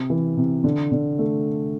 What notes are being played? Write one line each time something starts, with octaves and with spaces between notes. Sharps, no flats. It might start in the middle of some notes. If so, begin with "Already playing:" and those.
Already playing: C3
E3
C3
D3
D3
A3